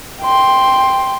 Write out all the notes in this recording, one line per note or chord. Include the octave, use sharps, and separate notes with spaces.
G5 C6